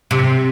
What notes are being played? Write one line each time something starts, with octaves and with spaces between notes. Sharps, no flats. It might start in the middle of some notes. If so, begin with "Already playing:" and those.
C3